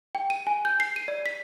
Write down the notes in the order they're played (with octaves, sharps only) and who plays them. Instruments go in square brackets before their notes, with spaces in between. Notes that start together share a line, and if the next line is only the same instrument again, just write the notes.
[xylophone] G5
D#7
G#5
G6
C7
D#7
D5
B6